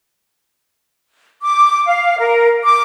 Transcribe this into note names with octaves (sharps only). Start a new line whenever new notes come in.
D6
F5
A#4
D6